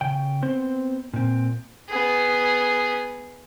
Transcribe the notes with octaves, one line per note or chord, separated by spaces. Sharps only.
C#3 G5
B3 C4 C5
A#2 C4
B3 G#4